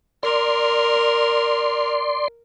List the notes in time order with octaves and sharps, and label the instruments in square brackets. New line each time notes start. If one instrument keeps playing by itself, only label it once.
[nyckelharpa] A#4 [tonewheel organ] D5 C6